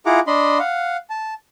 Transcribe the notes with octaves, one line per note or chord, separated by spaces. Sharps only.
E4 F4 G#4 F#5 A#5 D6
D4 D#5 B5 C6
F5 F#5
A5